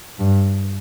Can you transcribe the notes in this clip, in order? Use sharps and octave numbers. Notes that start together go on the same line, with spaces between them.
G2